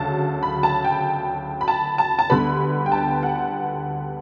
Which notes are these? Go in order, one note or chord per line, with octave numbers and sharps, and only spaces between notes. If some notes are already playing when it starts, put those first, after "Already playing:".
Already playing: D2 C#3 F#3 A5
B5
A5
G5
B5
A5
A5
A5
D2 D3 G3 B3 B5
G5
A5
F#5